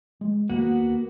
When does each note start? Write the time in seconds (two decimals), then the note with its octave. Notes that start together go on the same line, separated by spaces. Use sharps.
0.21 G#3
0.50 D#2 A#3 B3 F#4